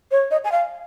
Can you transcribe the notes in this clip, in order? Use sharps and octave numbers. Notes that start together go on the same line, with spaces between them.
C#5
D#5
G#5
F5